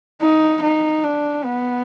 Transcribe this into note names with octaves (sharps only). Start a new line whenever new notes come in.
D#4
D#4
D4
B3